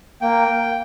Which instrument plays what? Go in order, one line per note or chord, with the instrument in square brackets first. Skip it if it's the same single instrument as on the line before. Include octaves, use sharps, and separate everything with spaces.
[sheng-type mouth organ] A#3 G5